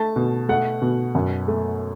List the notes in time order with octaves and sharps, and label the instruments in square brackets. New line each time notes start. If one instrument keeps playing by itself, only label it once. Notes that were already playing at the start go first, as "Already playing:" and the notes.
Already playing: [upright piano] A3 A5
B2
A3 F#5
B2
F#2
A3